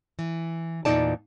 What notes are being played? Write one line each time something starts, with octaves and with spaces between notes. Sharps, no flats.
E3
E2 G2 A#2 D#4 D5 A5